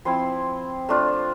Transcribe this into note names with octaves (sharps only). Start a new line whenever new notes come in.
F3 C4 E4 C6
A3 D4 F4